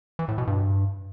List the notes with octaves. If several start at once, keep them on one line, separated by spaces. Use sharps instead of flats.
E3
A2
B2
G2